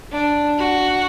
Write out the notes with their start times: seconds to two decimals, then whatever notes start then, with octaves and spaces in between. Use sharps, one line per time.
0.12 D4
0.58 F#4